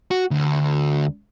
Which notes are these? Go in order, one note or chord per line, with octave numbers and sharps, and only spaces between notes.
F#4
D2